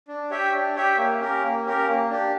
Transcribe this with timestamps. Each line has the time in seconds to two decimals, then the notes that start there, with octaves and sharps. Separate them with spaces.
0.08 D4
0.30 G4 C#5 E5 G5
0.53 D4
0.75 G4 C#5 E5 G5
0.97 A#3
1.20 C#4 G4 A#4
1.42 A#3
1.65 C#4 G4 A#4
1.87 A#3
2.10 D4 G4